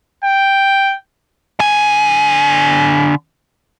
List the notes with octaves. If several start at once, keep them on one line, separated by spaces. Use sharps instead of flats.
G5
D3 G#5